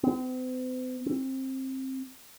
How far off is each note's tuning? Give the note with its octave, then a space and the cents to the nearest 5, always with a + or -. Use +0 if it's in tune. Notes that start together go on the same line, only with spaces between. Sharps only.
C4 -45
C4 +20